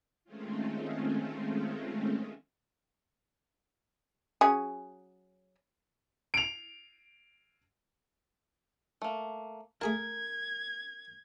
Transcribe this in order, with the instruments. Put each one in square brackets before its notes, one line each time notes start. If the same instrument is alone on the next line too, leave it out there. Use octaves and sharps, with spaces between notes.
[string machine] D#3 G#3 A3 C4 C#4 F4
[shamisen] F#3 C#4 G#4
[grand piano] D7 F7
[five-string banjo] A3 A#3
[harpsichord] A3 G#4 A5 [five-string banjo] A#4 [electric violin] G#6